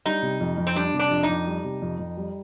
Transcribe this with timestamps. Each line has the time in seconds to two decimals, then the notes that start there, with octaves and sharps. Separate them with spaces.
0.06 G3 D#4
0.23 C3
0.40 F2
0.58 F2
0.67 C4
0.76 G3 D4
0.94 C3
0.99 D4
1.11 F2
1.23 D#4
1.29 F2
1.47 G3
1.64 C3
1.82 F2
1.99 F2
2.17 G3